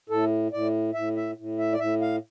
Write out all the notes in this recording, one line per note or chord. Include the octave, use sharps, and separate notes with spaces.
A2 A4
A2 D5
A2 E5
E5
A2
E5
D5
A2 E5
F5